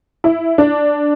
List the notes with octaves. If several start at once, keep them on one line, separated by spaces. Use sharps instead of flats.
E4
D4